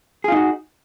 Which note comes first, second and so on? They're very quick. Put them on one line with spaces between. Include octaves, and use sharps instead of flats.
G#4 F4 D#4 F#4